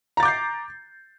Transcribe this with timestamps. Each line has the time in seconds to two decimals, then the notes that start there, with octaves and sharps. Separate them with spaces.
0.17 A#5
0.20 A6
0.23 D6
0.25 G6
0.28 C7